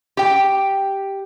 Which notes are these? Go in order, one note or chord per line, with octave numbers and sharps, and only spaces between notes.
G4 G5